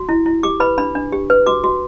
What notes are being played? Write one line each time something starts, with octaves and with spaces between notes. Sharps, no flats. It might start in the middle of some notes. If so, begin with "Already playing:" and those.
Already playing: F#4
E4
E4
G4 D6
B4 B5
D4 B5
D4
G4
B4
F#4 D6
F#4